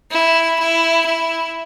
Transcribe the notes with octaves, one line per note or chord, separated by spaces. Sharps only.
E4
E4
E4